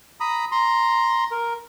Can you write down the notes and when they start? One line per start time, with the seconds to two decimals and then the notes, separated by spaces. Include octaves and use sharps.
0.20 A#5 B5 D#6
0.52 A#5 C6
1.31 A#4